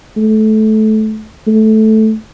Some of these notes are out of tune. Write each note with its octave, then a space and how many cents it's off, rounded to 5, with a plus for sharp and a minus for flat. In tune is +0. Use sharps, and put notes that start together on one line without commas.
A3 -20
A3 -10